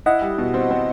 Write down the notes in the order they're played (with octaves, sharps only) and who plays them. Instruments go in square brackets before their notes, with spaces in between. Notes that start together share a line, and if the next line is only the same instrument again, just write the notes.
[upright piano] E4 [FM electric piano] D#5 F#5
[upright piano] G3
B2
C4
C4